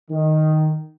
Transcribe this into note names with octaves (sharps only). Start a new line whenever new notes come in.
D#3